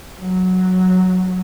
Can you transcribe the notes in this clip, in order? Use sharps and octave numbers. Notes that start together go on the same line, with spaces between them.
F#3